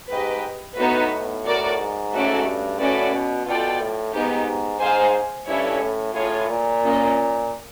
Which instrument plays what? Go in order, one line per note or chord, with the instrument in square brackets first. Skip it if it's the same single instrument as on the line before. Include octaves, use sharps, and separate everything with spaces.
[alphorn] G#2 [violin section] G4 B4 D#5
[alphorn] A2 [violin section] B3 D#4 F#4 B4
[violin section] F#4 A#4 D5
[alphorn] G#2
[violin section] A3 C#4 F#4 A4 D5
[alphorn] G2
[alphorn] A2 [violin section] C#4 F#4 B4 D5
[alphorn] B2
[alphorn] B2 [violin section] F4 A4 D5 G5
[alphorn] A2
[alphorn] G#2 [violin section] B3 D#4 G4
[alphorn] G#2 [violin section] G#4 C5 F5 G#5
[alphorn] G2 [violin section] C#4 E4 A4 C#5
[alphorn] A2
[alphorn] A2 [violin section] F4 G#4 C#5
[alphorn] A#2
[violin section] A#3 C#4 F4 A#4 D#5